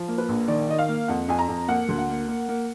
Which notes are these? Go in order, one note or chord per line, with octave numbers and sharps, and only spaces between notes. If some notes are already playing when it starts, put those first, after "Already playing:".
Already playing: F3
A#3
B4
A#1
D#3 D5
D#3 D#5
F5
A#3
F2 F#5
F2 G#5
A#5
F2
A#3 F#5
D2
F#5
A#3
A#3
A#3